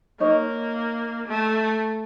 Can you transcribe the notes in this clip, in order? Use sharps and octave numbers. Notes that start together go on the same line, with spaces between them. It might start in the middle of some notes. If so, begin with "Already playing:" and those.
A#3 D#4 C#5 D#5
A3